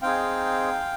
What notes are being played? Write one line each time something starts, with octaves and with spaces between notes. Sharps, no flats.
C4 D#4 G#4 F5 G5